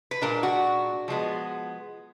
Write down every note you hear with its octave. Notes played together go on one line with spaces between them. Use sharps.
B4
A#2 G#3 D4 A#4
F#4
F3 G#3 B3